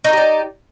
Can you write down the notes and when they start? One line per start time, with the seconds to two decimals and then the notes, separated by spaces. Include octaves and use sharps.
0.04 D#4
0.09 A3
0.13 G4
0.17 D5